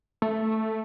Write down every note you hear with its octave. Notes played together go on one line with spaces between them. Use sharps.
A3